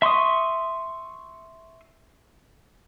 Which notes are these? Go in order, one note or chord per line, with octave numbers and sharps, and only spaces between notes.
E5 C6 C#6 D#6